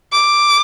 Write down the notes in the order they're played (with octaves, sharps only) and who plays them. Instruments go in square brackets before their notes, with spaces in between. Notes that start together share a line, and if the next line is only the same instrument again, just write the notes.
[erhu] D6